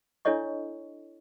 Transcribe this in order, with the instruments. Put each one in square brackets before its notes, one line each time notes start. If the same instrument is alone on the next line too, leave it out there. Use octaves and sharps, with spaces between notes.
[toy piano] D4 E4 A4 C#5 D#5 C#6